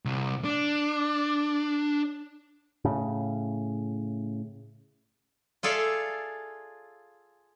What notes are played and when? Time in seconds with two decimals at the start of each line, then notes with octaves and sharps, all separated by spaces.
0.05 C2
0.44 D4
2.85 A2 C#3
5.63 F4 G#4 A4 D5 E5 F5